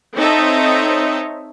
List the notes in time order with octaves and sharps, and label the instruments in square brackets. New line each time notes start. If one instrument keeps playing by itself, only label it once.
[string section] C4 D#4 A4 C#5 D#5 E5